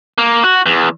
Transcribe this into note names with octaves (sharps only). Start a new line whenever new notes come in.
A#3
F#4
E2